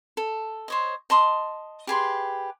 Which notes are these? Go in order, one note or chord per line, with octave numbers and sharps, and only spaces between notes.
A4
C5 C#5 D#5
D#5 A5 C6 D#6
G4 G#4 B4 C6